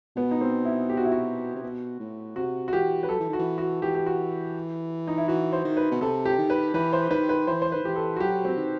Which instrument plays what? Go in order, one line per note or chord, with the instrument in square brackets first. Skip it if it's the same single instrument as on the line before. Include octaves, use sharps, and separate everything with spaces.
[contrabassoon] B2 [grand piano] B3
[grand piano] D#4
C4
E4
G4
F#4
E4
F#4
[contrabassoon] C3
B2
A2
[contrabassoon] C3 [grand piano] F#4
[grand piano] F#4
[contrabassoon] E3 [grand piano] G4
[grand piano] B4
[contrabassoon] F#3 [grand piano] A4
[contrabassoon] E3
[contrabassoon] D#3 [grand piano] F#4
[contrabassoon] E3
[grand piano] F#4
[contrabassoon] E3 [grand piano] G4
[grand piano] G4
F#4
D#4
E4
[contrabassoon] E3 [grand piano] F#4
[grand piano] C5
[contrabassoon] D#3
[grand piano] B4
[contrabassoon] B2
[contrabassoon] C3 [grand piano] A4
[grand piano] G4
[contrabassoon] D#3
[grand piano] B4
[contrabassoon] E3 [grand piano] B4
[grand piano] C5
[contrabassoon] D#3 [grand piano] B4
[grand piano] B4
[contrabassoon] E3 [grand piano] C5
[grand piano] C5
[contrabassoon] D#3 [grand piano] B4
[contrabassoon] E3 [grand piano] G4
[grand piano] A4
F#4
[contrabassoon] F#3 [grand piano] G4
[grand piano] C4
[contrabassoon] D#3